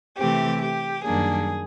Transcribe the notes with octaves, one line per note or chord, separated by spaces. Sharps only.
C3 E3 A3 C4 G4
G4
F#2 D#3 G3 A#3 D4 G#4